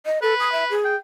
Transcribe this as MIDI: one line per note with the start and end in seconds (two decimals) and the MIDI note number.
0.06 0.19 75
0.22 0.34 69
0.22 0.76 71
0.40 0.51 87
0.52 0.64 76
0.70 0.95 68
0.85 0.97 79